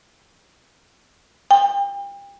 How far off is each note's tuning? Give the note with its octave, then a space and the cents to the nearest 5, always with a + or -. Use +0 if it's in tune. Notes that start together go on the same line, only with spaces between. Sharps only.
G5 +35